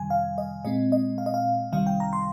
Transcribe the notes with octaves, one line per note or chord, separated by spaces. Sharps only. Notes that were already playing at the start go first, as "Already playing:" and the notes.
Already playing: F2 C3 D#3 G3 G#5
F5
D#5
A#2 G#3 C4 D#5
D#5
F5
D#5
F5
C2 C3 D#3 G3 F5
G5
A#5
C6